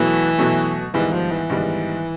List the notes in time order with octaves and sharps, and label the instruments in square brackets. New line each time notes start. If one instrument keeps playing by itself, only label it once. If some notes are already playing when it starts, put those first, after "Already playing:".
Already playing: [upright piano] B2 F#3 A3 [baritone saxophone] E3
[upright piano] B2 F#3 A3
[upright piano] G#2 D#3 G3 B3 [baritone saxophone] E3
[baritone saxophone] F3
E3
[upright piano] G#2 D#3 G3 B3